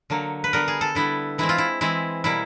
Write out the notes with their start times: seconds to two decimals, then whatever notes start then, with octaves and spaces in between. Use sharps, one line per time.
0.10 D3 F#3 A#3
0.44 B4
0.53 D3 G3 B3 A#4
0.68 G#4
0.81 A4
0.95 D3 G3 B3 E4
1.38 E3 G#3 C4 E4
1.49 F4
1.58 E4
1.81 E3 G#3 C4 E4
2.24 B2 G3 A#3 E4